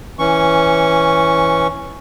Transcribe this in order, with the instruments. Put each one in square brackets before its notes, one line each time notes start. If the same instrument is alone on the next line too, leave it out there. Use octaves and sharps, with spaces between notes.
[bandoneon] E3 C#4 C#6